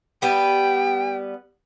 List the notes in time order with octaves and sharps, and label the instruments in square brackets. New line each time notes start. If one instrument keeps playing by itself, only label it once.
[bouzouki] G3 B3 [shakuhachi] G5